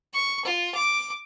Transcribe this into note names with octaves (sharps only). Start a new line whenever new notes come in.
C#6
F4
D6